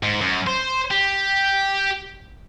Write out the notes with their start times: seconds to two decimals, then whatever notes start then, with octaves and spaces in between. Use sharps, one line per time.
0.03 G#2
0.21 F#2
0.47 C5
0.91 G4